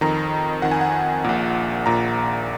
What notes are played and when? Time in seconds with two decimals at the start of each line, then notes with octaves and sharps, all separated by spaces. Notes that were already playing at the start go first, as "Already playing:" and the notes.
0.01 F2 D#3 A#5
0.62 F2 D#3 F#5
0.72 G#5
0.81 F#5
1.24 A#1 A#2
1.86 A#1 A#2 A#5